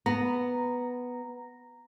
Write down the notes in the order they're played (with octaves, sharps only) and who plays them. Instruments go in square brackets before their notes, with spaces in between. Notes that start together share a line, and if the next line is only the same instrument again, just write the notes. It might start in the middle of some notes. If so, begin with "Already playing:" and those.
[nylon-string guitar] B3 [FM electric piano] A#5